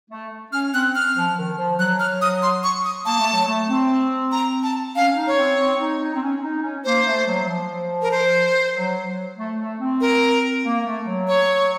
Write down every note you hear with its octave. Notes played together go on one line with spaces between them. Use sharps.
A3
C#4 F6
C4 F#6
F6
F3
D#3
F3
F#3 F#6
F6
D#6
C6
C#6
D#6
A#3 A5
A3
F#3
A3
C4
A#5
A5
C#4 F5
D#4
C#5
C4
C4
D#4
D#4
C4
C#4
D#4
C#4
A#3 C5
A3
F#3
F#3
F3
A#4
C5
F#3
F#3
A3
A3
C4
A#4
A#3
A#3
A3
F#3
C#5